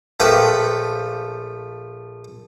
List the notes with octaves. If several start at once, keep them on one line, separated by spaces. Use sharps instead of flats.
A#1 F3 A3 B4 G5 D6